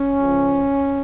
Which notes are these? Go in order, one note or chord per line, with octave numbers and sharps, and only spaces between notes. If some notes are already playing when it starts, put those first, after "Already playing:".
Already playing: C#4
C#2 C#3 F3